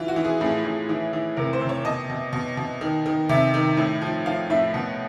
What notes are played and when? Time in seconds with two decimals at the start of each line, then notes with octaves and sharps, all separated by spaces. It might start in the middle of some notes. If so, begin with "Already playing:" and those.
Already playing: E3 F4
0.08 F#4
0.16 E3
0.25 G#4
0.40 A2 G#4
0.65 A2
0.89 E3
1.13 E3
1.37 C3 A#4
1.53 C5
1.61 C3
1.69 C#5
1.85 B2 D#5
2.10 B2
2.33 B2
2.57 B2
2.81 D#3
3.06 D#3
3.29 C3 E5
3.54 D#3
3.77 A2
4.02 F3
4.26 F3 F5
4.50 A2 E5
4.74 B2 F#5